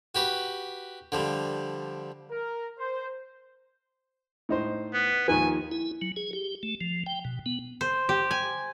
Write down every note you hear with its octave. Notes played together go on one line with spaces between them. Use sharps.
F#4 G4 B4
D3 F3 G3
A#4
C5
A2 D#4 C5
B3
D#2 D#3 F3 G#5
E4
F#3
G#4
G4
A3
F3
G5
B2
B3
C5
G4
G#5